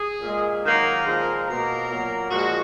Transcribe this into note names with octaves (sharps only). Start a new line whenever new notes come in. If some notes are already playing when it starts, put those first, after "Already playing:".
Already playing: G#4
A#2 G#3
D#3 F#3 A#3 A#4
A#2 F3 G#3
B2 A#3 A#4
A#2 F#3 A#3
A#2 F3 G#3 F#4